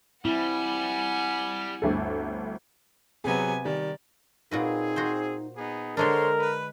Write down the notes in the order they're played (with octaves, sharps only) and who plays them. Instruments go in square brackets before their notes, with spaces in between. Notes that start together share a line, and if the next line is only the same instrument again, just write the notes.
[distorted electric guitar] G3 [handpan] C4 E4 [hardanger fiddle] F#5 G#5
[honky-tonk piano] G1 D2 A4
[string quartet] C3 B3 G#5 [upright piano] F#3 G#4
[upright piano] D#3 G3 [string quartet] D5
[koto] A#2 F#4 B4 [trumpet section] C4 G#4 [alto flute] D#4
[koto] F#4 C5
[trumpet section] B3 D#4 G#4
[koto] D3 G#3 D4 [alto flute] A4 [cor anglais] A#4 [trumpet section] C5 C#5 C6
[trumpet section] B4